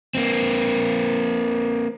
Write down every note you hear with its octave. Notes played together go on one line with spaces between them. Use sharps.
A#3 C4